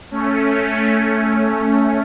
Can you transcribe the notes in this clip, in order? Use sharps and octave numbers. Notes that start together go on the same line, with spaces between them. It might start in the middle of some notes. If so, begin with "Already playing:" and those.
A3 C#4